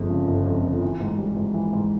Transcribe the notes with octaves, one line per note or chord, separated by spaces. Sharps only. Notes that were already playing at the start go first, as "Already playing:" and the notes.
Already playing: G1 F2 G#3
C#3
G1
F2
G1
E3
G#2
G3
G#2
E3
G#2